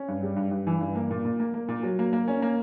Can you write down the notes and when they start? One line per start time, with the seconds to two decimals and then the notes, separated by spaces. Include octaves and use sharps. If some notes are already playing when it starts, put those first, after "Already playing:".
Already playing: C#4
0.08 G2
0.23 G3
0.36 G2
0.51 G2
0.67 E3
0.81 G2
0.95 A#3
1.11 A#2
1.25 A#2
1.40 A#3
1.54 A#3
1.68 A#2
1.83 F#3
1.99 A#3
2.13 A#3
2.28 C#4
2.42 A#3